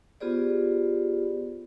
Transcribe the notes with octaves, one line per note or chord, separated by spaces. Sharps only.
B3 F4 G4 G#4 C5 D5